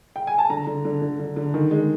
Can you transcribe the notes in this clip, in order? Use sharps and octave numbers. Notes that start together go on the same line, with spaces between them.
G5
G#5
A5
D3 A#5
D3
D3
D3
D3
D3
D#3
G#3